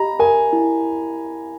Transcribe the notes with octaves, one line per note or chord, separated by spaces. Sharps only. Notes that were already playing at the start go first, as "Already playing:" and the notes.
Already playing: G4 D#5 A#5 B5
A#4 G#5
E4